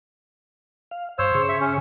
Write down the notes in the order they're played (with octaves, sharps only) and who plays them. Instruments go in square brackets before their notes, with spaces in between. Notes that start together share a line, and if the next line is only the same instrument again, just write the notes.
[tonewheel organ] F5
[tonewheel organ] G2 [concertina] C5 C#5 E6
[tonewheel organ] C#3 G#4 C#6
[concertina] E5
C#4